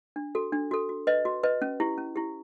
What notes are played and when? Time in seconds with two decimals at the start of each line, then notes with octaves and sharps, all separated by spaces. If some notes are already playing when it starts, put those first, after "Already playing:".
0.16 D4
0.35 F#4 A4
0.52 D4
0.71 F#4 A4
0.89 F#4
1.07 B4 D#5
1.25 F#4
1.43 B4 D#5
1.62 C#4
1.80 E4 G4
1.98 C#4
2.16 E4 G4